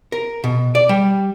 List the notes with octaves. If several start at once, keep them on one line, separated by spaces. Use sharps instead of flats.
A#4
B2
D5
G3